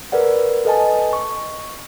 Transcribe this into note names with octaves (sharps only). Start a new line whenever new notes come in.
A#4 B4 D5 F#5
A4 B4 D#5 G#5 A5
C#6